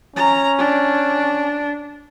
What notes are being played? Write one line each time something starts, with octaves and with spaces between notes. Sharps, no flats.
C#4 A#5
D4